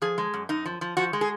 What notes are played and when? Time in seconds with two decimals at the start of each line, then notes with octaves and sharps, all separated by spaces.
0.02 F3 G#4
0.18 G#3
0.34 F#2
0.49 F#2 D#4
0.66 F3
0.81 F3
0.97 F3 F#4
1.13 G#3
1.21 G#4